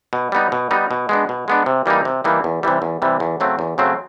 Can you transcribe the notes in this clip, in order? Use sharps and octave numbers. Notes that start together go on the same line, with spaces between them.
B2
G3 B3 D#4
B2
G3 B3 D#4
B2
G#3 B3 D4
B2
G#3 B3 D4
C3
E3 G3 A#3 D#4
C3
E3 G3 A#3 D#4
E2
C3 E3 G3
E2
C3 E3 G3
E2
C#3 F#3 A3 C4
E2
C#3 F#3 A3 C4